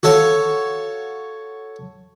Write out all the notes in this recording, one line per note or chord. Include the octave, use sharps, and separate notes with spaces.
F#4 A4 C#5 F5